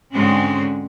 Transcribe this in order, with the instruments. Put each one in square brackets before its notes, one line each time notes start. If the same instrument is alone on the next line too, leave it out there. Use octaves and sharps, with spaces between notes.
[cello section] G#2 D3 G#3 C4 C#4 F#4